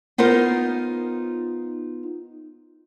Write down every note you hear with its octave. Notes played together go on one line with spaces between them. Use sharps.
B3 D#4 F4 A#4 C5